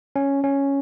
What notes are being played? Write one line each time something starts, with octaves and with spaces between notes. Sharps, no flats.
C#4
C#4